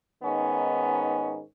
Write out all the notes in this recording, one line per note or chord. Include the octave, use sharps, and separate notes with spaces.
G#2 D#3 B3 C#4